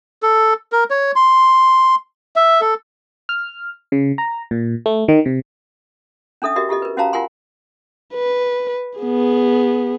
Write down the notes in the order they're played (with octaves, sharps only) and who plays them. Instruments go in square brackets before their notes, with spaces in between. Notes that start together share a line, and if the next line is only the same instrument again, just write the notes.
[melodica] A4
A#4
C#5
C6
E5
A4
[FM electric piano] F6
C#3
A#5
A#2
A3
D#3
C3
[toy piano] C#4 D4 A4 E5 D#6
F#4 G4 A#4 D#5 E5
F4 G4 A4 D#5
A#4 B4
C#4 F#4 C5 F5 A5 A#5
F4 A#4 F#5 G#5 C6
[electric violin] B4
B3 G#4